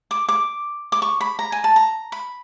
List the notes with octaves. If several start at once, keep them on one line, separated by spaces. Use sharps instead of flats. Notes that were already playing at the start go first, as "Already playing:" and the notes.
D6
D6
D6
C#6
B5
A#5
G#5
A5
A#5
B5